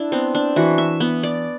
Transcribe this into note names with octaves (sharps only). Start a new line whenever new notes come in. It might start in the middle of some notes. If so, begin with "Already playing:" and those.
Already playing: D4 E4
B3 C4
D4
E3 F#4
E5
B3
D5